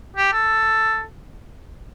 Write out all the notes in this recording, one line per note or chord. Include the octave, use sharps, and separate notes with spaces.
G4
A4